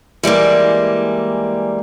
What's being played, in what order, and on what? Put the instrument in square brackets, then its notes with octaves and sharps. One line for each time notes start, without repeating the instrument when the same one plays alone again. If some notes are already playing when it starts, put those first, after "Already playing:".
[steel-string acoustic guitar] E3 G3 G#3 A#3